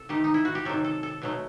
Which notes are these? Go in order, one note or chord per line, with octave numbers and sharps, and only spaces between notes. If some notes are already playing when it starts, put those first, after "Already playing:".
Already playing: C3 A4
D#3 A3 G4
D#4
E4
F#4
G4
C3 D#3 F#3 A4
A4
A4
B2 F#3 A3